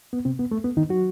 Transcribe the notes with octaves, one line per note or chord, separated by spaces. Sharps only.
B3
C3 C4
B3
A3
B3
D#3 D#4
F#3 F#4